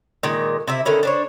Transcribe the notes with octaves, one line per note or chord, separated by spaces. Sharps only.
A#2 D#3 G#3
C3 E4 E5
D3 D#3 C#4 E4
D4 C5 C#5